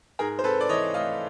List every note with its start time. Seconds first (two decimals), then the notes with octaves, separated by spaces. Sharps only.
0.19 G#2 G#4 A#4
0.39 C5
0.44 C4 A4 B4
0.61 D5
0.69 E3 C#5 D#5
0.94 A3 D#5 F5